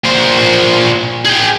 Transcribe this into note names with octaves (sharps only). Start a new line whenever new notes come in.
A#2 C5
G#4 G5